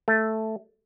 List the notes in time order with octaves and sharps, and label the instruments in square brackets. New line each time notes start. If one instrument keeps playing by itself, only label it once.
[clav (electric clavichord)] A3